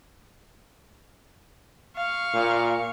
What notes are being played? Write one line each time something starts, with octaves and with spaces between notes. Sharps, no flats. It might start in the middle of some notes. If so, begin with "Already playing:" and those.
F5 C#6
A#2